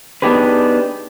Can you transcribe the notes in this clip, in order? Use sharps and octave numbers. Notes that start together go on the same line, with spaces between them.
B3 D4 D#4 G4 G#4 B4